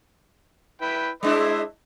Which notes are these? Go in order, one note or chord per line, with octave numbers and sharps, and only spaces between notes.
E4 B4 G5
G#3 D4 E4 C5 D#5 E5